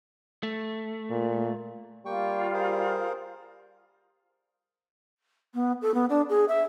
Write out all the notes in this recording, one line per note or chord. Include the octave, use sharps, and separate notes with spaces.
A3
A#2
G3 A#3 F4 G5 C#6
G#4 A#4 C5
B3
A4
B3
D4
G#4
E5